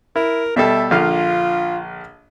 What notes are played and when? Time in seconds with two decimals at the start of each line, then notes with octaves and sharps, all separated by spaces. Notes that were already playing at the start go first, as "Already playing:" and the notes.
0.16 E4 A#4
0.56 B2 G3 A4 E5
0.91 A#1 D3 F4 F5